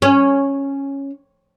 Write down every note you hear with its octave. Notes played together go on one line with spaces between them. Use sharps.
C#4